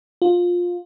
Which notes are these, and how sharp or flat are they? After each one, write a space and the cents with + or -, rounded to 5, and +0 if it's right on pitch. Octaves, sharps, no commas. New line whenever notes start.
F4 +15